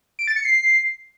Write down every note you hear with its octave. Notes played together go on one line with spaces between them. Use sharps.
D7
A6
C#7
C7